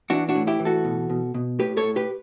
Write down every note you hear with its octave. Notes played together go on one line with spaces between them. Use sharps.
E3 D4 F#4
D4 F#4
A2
E4 G4
E3
F#4 A4
B2
B2
B2
A2 G4 B4
A4 C#5
A2
G4 B4